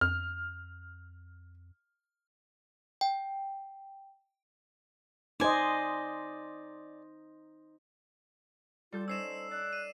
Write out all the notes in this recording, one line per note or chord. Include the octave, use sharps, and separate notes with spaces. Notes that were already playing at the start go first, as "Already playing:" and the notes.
F2 F6
G5
D#4 C5 D5 D#5 G#5
G3 F4 A4 G6
C#4 D#4 C5 E6 C7 E7
D5 F#6
D#7